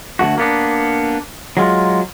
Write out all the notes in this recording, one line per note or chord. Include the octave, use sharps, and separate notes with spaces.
D2 G2 A3 F#4
A#3 B3 D4
F#3 G#3 F4